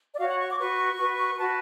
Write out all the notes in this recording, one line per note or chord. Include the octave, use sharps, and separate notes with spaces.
D5
F#4 C#5 F5
F#5
C#6
D6
F#4 B4 C#6
F#4 B4
F#4 B4 A5